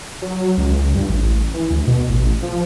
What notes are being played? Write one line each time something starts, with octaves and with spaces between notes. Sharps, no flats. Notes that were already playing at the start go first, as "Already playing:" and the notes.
F#3
C#2
G2
A1
E3
D2
B2
A1
F3